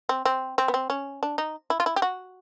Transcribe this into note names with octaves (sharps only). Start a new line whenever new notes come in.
C4
C4
C4
B3
C4
C#4
D4
D#4
E4
F4
E4
G4
F#4